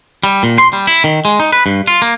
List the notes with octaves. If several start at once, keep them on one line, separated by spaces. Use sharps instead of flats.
G3
A#2
C6
G3
E4
D#3
G#3
D#4
B4
G2
F4
A#3